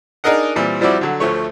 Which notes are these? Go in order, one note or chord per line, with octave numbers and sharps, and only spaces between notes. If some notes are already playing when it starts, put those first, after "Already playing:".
D4 D#4 G#4 A#4 D#5 F#5
A#2 E3 G3 C4
F3 G3 C4 E4 F#4 D5
D3 F#3
D2 F3 A3 C#5